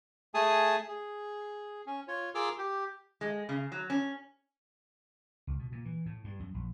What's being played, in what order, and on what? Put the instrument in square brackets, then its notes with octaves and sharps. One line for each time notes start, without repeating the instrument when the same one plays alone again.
[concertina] A3 G#4 G#5 A5 D#6
G#4
C#4
F4 C#5
F4 G#4 A#4 D6 E6 F6
G4
[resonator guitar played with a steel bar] G#3
C#3
F#3
C#4
[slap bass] C#2
B2
A#2
E3
A2
G2
F#2
A#1